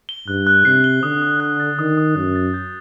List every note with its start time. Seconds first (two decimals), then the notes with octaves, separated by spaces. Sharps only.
0.09 G7
0.28 G2 F#6
0.47 F#6
0.65 C3 C7
0.84 G7
1.03 D3 D#6
1.22 D#6
1.40 F#6
1.60 A6
1.79 D#3 D#6
1.97 D#6
2.16 F#2 F#6
2.35 A6
2.54 G6